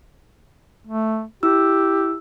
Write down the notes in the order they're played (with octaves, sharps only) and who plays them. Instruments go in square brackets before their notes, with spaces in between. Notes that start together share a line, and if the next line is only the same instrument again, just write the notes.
[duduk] A3
[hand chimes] E4 E6 [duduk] G4